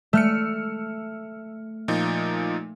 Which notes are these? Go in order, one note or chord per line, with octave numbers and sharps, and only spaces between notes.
A3 E6 F6 C#7
A#2 F3 D#4